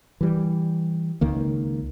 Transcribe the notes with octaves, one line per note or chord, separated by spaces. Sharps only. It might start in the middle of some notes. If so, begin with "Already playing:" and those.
E3 G3
C#2 D#3 A#3